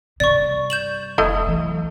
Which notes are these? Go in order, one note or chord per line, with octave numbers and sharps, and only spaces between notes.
G2 C3 D5 C#6
G6 E7 F#7
F1 A3 E4 D#5
E3 F#3